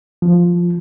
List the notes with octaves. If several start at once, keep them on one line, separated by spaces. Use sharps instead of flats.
F3